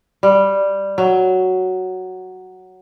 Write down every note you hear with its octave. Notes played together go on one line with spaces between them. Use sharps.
G3
F#3